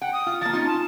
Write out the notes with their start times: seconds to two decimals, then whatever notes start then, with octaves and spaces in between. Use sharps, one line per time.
0.02 F#5 G5
0.13 D#6
0.26 F4
0.41 F3 A#3 A6
0.53 C#4 D#4 F4
0.67 A5